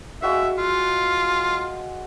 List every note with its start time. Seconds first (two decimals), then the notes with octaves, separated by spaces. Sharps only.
0.22 G#3 F#4 E5 F5
0.58 F4